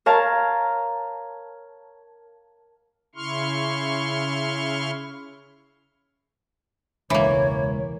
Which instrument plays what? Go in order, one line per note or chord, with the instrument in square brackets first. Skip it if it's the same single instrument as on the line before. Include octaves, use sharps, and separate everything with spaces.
[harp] A#4 C#5 F5 A5 A#5
[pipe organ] C#3 E4 C6 C#6 F6
[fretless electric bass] E1 C#2 [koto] E3 A#3 [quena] C#5